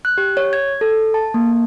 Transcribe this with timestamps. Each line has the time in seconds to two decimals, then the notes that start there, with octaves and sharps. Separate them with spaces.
0.05 F#6
0.18 G4
0.37 C#5
0.53 G#6
0.81 A4
1.14 A5
1.34 A#3